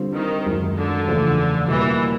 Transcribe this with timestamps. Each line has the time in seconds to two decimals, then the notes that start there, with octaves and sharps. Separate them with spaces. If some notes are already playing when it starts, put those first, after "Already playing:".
Already playing: D3 G3 C4 F4
0.15 D#3
0.46 F#2 D#3 G#3
0.76 D3
1.07 E2 C#3 F3 A3
1.68 B2 E3 G3 A#3